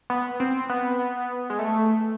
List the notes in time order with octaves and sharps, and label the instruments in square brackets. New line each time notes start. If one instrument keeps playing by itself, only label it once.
[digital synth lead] B3
C4
B3
G#3
A3